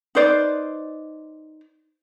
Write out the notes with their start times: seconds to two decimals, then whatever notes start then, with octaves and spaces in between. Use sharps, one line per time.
0.15 D#4 B4 C5 D5